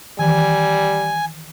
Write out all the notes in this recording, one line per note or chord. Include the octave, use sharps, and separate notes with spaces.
D#3 E3 G3 G#5